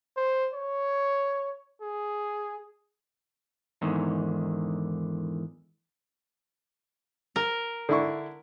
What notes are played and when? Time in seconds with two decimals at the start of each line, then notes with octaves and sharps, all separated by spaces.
0.17 C5
0.54 C#5
1.82 G#4
3.82 E2 G#2 D3 D#3
7.36 A#4
7.89 D3 E4 C#6